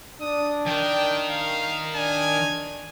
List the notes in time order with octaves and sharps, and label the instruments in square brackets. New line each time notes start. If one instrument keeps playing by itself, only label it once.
[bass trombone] D4 [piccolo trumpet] D#6
[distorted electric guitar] D#3 [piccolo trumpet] G5
[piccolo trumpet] F5
[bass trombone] D4 [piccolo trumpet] G#5